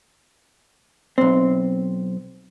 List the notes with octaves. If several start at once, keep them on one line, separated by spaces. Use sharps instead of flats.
B1 C4